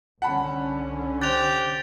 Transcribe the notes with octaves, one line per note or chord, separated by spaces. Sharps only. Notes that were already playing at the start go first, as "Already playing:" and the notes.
C2 D3 C#4 F#5 A5 B5
G4 C5 F#6 A6 F7